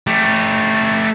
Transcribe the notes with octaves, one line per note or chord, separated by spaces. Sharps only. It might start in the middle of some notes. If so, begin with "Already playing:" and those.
A3 G4